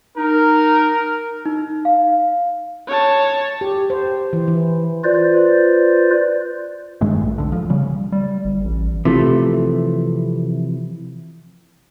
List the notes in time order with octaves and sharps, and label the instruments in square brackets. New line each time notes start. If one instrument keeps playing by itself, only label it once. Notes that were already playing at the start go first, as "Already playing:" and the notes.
[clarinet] D#4 [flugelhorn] A#4
[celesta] D#4
F5
[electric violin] C#5 A5
[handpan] G4
C5
E3
E3
[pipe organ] F4 B4 C5 D5
[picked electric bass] G2 D#3 G#3 A3
A#1
B1 D3
F3
C#3 G3
[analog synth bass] G3
G1
A1
[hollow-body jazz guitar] C3 E3 F3 A3